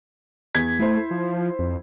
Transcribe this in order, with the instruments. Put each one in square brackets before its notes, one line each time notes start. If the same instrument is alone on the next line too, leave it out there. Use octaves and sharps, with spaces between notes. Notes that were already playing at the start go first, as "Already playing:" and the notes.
[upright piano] E2 G#6 B6
[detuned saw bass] A3 [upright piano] E4 C5
[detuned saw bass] F3
F2